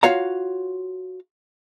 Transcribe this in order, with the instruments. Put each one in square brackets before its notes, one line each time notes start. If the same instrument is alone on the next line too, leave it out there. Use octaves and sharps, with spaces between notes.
[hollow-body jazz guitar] F4 F#4 C#5 F5 A#5